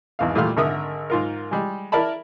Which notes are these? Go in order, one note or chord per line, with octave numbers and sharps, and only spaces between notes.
G#1 E2 F5
A#2 G3 A3 F4 F5 F6
G#1 D3 A#4 E5 D#6
G#2 F4 A#4
G3 G#3
E4 A#4 D5 E5 A5 B5